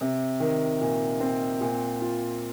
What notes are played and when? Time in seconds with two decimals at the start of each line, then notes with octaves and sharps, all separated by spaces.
0.01 C3
0.40 D#3
0.81 A#2
1.20 C4
1.61 A#2
2.02 F4